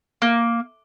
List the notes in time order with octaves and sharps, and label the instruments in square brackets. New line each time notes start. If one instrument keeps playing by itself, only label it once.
[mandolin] A#3